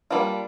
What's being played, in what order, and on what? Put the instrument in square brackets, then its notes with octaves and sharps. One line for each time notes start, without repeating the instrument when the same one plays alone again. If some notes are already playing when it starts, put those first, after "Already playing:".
[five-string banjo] G3 A#3 D4 F4